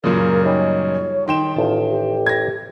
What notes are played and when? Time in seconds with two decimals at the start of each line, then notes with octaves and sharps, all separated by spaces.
0.04 F#2 A#2 C#3 A#4
0.44 G3 D#4 G#4 C#5
1.28 D#3 G5 C6 E7
1.56 A1 F4 A5
1.89 G4
2.26 G#6 A#6